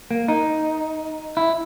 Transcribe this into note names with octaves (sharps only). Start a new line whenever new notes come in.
A#3
D#4
E4